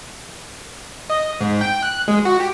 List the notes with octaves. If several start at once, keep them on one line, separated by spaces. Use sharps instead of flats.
D#5
G#2
G5
F#6
G#3
F#4
G4